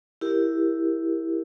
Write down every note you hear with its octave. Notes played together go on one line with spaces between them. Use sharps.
E4 G4 A#4